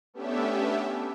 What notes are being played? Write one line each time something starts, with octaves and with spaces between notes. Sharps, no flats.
A3 B3 C#4 D4 G4 E5